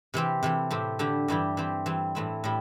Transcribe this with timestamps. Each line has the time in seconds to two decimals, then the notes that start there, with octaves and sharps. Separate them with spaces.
0.14 C3 E3 C4 G4
0.43 C3 E3 A3
0.71 A2 A3 C4 G4
0.99 D3 A3 E4 G4
1.28 G2 E3 G3 E4 G4
1.57 E3 C4 G4
1.86 E3 G3 C4
2.15 A2 E3 A3 C4 E4
2.44 A2 G3 E4